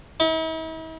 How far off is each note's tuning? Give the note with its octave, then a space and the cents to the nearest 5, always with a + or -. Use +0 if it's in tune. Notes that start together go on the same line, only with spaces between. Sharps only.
E4 -45